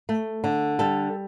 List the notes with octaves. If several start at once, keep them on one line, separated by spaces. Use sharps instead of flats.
A3
D3
G3 A4